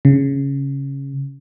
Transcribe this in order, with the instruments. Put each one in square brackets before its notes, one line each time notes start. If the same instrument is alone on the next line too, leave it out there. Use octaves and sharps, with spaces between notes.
[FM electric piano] C#3